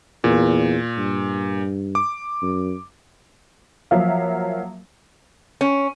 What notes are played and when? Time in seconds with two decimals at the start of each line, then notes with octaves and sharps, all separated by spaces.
0.24 E2 A#2
0.98 G2
1.95 D6
2.42 F#2
3.91 F3 F#3 A#3 A#4 E5 F5
5.61 C#4